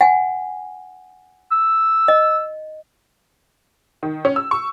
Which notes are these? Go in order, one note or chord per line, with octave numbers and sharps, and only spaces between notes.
F#5 G#5
E6
D#5
D#3
C#4
E6
C#6